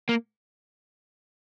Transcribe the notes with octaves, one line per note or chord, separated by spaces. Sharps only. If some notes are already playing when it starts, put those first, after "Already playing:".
A#3